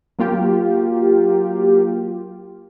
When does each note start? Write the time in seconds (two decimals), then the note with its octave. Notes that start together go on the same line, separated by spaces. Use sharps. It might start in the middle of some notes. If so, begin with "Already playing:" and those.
0.19 F#3 A#3 F4 G4